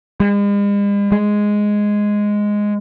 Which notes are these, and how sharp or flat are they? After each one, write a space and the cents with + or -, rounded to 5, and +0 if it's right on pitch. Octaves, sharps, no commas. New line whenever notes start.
G#3 -45
G#3 +0